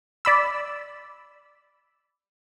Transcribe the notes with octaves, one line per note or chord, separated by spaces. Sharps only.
D5 B5 E6